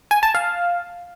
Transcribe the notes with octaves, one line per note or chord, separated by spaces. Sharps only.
G#5
A5
F5